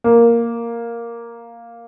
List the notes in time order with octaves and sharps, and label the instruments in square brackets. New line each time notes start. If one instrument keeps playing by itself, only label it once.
[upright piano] A#3